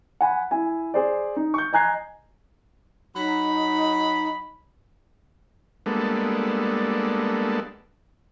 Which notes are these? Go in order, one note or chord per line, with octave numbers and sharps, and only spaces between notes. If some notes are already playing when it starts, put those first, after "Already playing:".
F#5 G#5 B5
E4 G#5
G#4 C5 D5
D#4
C#6 G6
D#5 G#5 A#5 F#6 G#6 C7
F#3 D#4 B5
G3 G#3 A#3 B3 D4 A4